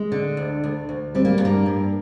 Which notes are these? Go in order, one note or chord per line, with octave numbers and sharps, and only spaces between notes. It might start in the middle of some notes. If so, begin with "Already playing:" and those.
Already playing: G#3
D3
D2
D2
D2
G3 C4
A#3
G2 A#3
G2